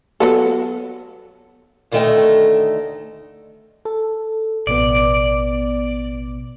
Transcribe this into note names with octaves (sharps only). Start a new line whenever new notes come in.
F#3 B3 A4
D2 D3 D#3 A3 D#5 G5
A4
A1 B2 B3 D5